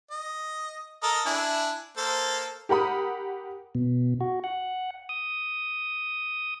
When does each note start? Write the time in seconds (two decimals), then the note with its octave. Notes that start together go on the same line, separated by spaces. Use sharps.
0.11 D#5
1.03 A4 A#4 D#5
1.26 D4 E4 G#5
1.97 A#3 A4 C5
2.69 G4 A#4 F#5 B5 D#6
3.75 B2
4.21 F#4
4.44 F#5
5.09 D#6